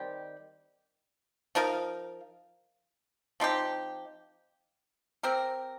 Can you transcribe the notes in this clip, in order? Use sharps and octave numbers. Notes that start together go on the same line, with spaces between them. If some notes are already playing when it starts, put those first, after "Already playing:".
Already playing: D#3 G3 C4 G4
F3 D#4 A#4 F5
F3 C4 D#4 G4
C4 G4 A#4